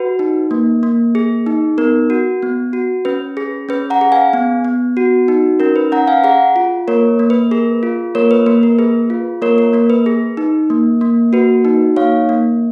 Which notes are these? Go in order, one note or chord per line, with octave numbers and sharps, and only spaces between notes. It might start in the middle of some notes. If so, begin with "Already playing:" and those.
Already playing: F#4 B4
D#4
A#3
A#3
G#4
D#4
B3 A#4
F#4
B3
F#4
C#4 B4
G#4
C#4 B4
F#5 A#5
G#4
F5 G#5
B3
B3
F#4
D#4
C#4 A#4
B4
C#4 F#5 A#5
F5 G#5
G#4 F#5 A#5
F4
A#3 A#4 C#5
A#3
B4
G#4 A#4
F4
A#3 A#4 C#5
B4
A#3 B4
A#4
G#4 B4
F4
A#3 A#4 C#5
A#4
A#3 A#4
B4
G#4
D#4
A#3
A#3
F#4 B4
D#4
A#3 C#5 F5
A#3